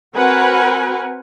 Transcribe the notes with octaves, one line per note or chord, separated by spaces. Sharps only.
C4 F#4 A#4 B4 F#5 G#5